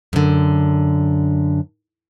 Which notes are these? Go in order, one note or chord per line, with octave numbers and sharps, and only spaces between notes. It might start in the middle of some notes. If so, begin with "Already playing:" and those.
F#2 D3